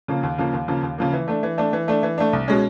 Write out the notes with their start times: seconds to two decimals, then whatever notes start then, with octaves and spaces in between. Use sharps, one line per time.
0.08 C#3 F3 A#3
0.23 D#2
0.38 C#3 F3 A#3
0.53 D#2
0.68 C#3 F3 A#3
0.83 D#2
0.98 C#3 F3 A#3
1.13 E3
1.28 A3 D4
1.43 E3
1.58 A3 D4
1.73 E3
1.88 A3 D4
2.03 E3
2.18 A3 D4
2.33 C2
2.48 B2 G#3 C#4